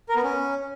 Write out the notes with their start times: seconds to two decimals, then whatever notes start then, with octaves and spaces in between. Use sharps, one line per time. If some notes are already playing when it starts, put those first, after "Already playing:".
0.09 A#4
0.16 B3
0.23 C#4